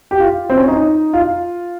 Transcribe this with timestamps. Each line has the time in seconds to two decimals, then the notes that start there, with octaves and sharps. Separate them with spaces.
0.11 G4
0.20 F4
0.50 C4
0.58 C#4
0.67 D#4
1.13 F4